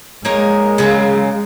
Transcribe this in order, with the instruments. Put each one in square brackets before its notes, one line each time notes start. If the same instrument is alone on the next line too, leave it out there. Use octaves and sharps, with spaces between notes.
[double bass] G#3 [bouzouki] A#3 D#4 A#4 C#5
[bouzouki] C#3 F#3 A#3